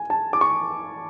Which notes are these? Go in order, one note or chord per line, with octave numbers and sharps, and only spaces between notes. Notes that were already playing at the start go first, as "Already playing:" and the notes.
Already playing: G#5
A5
D6
C#6